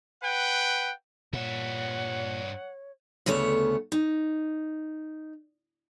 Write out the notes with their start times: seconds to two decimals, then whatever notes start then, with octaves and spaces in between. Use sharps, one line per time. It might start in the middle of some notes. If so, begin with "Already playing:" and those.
0.23 B4 F#5 G5
1.33 G2 A#2 C#5 E5 F#5
3.26 D2 C#3 A3 B3 C#5
3.92 D#4